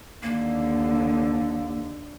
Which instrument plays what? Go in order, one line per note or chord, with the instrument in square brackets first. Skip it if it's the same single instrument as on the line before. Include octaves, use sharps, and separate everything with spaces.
[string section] D#2 D3 [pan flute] A#3